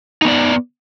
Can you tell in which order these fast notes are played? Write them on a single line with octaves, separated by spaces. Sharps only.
D#4 B3 D5